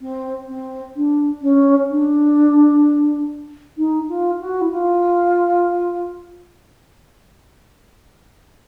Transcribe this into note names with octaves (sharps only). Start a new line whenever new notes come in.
C4
C4
D4
C#4
D4
D#4
F4
F#4
E4
F4